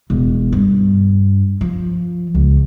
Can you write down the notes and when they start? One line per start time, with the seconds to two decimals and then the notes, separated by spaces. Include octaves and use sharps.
0.10 E1
0.52 G2
1.61 F3
2.34 C#2